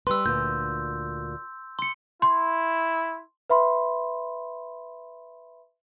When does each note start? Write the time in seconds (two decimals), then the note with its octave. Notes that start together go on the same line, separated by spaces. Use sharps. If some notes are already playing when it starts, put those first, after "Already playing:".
0.07 G3 B4 C6 E6
0.26 D2 A#2 G6
1.79 C6 C#7
2.22 E4 C6
3.50 B4 E5 B5 C6